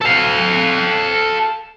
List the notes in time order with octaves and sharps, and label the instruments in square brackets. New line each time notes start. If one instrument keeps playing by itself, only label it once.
[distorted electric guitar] A4 F5